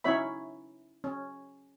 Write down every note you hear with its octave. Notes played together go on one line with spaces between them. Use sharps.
C#4 D#4 E4 C#5 E5 B5
C#4